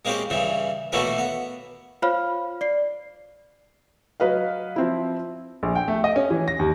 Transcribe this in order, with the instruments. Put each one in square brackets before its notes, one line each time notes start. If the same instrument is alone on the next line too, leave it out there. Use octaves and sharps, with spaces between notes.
[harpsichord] G#3 A#3 C4 C#4 G4
G2 C#3 E3
B2 E3 A3 A#3 C#4
B3
[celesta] F4 C5 C#5 F5 B5 F6
D5 C7
[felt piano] F#3 B4 D#5 F5
F3 C4 E4
[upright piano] A#1
G5
A3
D#5
C#4
E3
A#6
D#2